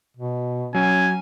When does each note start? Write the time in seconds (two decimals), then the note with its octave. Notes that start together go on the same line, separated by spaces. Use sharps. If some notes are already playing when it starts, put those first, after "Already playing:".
0.17 B2
0.75 F#3 C#4 G#5